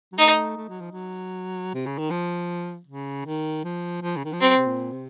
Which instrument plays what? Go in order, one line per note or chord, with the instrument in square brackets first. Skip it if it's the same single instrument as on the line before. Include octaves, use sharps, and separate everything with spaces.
[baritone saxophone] F#3
[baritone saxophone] A3 [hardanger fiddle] D#4
[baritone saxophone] A3
F#3
F3
F#3
C3
C#3
D#3
F3
C#3
D#3
F3
F3
C#3
D#3
F3
[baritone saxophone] F#3 [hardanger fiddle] C4
[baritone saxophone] C3
A#2
C3